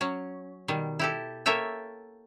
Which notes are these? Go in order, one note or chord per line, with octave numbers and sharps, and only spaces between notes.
F#3 C#4
B2 D#3 G3
E4 G4 A4
A#3 A4 C#5 E5 G5